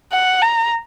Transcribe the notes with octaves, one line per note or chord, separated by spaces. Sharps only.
F#5
A#5